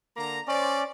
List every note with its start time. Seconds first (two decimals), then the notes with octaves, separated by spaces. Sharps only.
0.17 D3 A#3 A#5
0.47 C#4 C5 D5